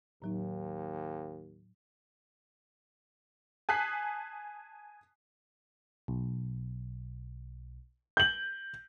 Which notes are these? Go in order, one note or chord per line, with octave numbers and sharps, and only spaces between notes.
D#2 A2 F#3 D#4
G#5 A5 D#6 F#6 B6 C7
B1
G6 F#7